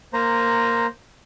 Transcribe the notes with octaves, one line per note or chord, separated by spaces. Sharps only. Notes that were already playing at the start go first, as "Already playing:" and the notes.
A#3 C5 A#5